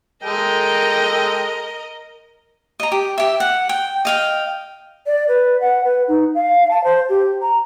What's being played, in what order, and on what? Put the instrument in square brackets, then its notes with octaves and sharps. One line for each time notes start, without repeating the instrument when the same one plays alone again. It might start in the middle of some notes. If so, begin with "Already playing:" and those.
[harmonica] G#3 A4 G5 [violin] A#4 D#5
[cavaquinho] D#5 A#5
G4
G4 E5
F#5
G5
D#5 F5 G5
[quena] D5
B4
F#5
B4
D#4
F5
A5
C5
G4
A#5